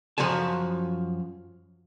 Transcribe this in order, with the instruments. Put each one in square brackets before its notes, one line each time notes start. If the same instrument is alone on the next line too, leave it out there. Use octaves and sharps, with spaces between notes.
[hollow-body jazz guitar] F#2 E3 F3 F#4 G#5 A5